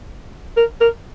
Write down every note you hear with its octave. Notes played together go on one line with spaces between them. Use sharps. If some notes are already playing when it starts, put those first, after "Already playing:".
A#4
A#4